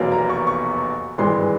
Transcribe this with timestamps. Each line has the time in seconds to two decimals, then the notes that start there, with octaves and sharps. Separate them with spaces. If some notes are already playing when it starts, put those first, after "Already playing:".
Already playing: F1 E2 B2 F#3 A#3
0.12 A#5
0.30 C#6
0.47 C#6
1.18 G#1 G2 E3 G#3 C6